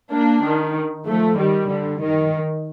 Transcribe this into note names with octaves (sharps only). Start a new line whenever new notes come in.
A#3 D4
D#3
F3 A3
D#3 G3
D3
D#3